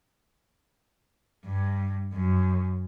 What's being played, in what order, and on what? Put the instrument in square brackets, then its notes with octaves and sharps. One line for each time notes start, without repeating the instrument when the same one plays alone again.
[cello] G2
F#2